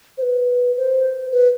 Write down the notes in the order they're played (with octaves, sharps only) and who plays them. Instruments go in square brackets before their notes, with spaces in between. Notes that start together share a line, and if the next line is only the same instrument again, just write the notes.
[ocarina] C5
B4
C5
B4